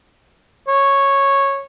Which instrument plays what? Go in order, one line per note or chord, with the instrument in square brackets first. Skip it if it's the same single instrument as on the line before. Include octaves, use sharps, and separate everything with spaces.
[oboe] C#5